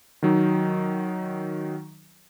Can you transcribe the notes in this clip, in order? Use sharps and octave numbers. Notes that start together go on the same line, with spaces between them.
D#3 F#3 D#4